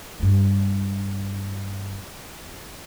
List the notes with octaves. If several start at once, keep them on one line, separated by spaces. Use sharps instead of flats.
G2 A#3